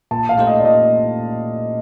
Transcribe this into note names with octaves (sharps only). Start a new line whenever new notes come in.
A#2 A5
F5
A3 D#4 G4 C5
D#5
D5
A#2 D#5